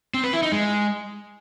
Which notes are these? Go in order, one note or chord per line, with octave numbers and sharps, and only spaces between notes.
C4
B4
E4
D#4
G#3